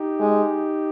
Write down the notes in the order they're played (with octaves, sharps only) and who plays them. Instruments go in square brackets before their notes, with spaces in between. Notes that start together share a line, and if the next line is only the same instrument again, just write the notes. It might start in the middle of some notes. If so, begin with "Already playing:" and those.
Already playing: [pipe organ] D#4 G4
[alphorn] G#3